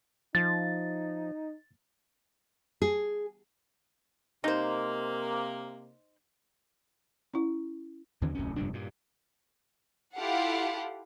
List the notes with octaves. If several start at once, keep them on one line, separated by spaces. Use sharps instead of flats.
F3 D#4 A6
G#4
C3 A#3 D#4 C5
C#4 E4
D#2 D3 E3 C4
D1 C2 F#2 C#4
F1 G2 A#2 D4
G2 A#2
E4 F4 G4 A4 F5 F#5